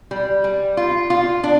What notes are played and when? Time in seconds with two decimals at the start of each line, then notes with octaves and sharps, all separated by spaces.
0.11 G3
0.44 G3
0.77 F4
1.10 F4
1.44 D4